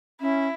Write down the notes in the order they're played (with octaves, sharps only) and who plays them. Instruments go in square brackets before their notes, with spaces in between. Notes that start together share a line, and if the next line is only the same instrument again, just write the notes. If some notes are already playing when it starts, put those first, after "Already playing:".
[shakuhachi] C#4 [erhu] E4